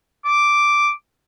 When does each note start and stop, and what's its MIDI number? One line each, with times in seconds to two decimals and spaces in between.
0.25 0.89 86